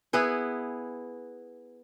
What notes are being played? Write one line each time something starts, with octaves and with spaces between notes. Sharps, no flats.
B3 E4 G#4 B4